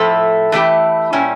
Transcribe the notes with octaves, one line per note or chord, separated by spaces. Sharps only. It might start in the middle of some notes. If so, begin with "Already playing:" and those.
Already playing: A2 F3 A3 E4 A4
E3 A3 E4 G4
A#2 G3 C#4 E4